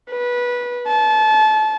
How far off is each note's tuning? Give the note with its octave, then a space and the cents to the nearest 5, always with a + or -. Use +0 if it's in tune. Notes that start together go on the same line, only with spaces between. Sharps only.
B4 -20
A5 -30